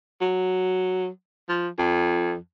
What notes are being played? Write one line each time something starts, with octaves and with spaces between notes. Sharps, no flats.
F#3
F3
F2